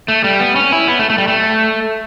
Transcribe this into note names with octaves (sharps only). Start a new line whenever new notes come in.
A3
G3
B3
C#4
E4
B3
A3
A3
G3
A3